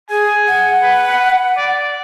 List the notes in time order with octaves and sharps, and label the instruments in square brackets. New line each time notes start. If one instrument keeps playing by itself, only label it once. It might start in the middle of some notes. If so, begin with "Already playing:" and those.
[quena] G#4 [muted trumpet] G#5
[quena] F#5
[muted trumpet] B4
D5